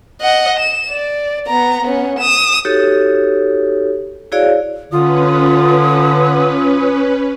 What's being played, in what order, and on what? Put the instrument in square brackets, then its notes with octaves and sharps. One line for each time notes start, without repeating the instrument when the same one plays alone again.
[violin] D#5 F#5
E7
D5
B3 A#5
B3 C#4
D#6 E7
[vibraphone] D#4 F#4 G4 A4 C#5
E4 F#4 G#4 C#5 D5 F5
[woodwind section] D3 [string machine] C#4 B4 [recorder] F4 [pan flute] D#6